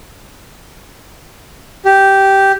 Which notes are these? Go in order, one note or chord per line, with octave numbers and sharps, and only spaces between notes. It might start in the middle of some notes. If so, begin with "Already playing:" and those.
G4